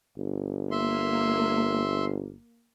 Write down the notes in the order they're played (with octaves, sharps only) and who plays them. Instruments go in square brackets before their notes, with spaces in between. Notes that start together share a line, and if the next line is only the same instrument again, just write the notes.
[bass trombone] G1
[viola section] A#3 [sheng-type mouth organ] E5 C6